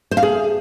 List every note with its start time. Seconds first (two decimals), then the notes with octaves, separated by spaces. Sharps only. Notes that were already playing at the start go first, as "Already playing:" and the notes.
0.11 C5
0.17 F5
0.23 G#4